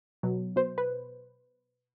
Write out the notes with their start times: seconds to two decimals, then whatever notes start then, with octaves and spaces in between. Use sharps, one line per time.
0.23 B2 F#3
0.56 B2 C5
0.78 B4